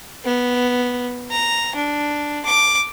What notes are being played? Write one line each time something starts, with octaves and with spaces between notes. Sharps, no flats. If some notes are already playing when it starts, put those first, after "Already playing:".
B3
A#5
D4
D6